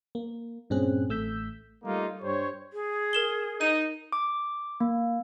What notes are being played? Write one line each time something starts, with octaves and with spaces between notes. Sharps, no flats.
A#3
G2 A#2 C4 C#4 G#4 F#6
A1 A3 E6 G6 B6
G3 A3 A#3 D#4 F4
G2 G3 C5 C#5
G#4
A#4 E7 G7
D#4 D#7
D6
A#3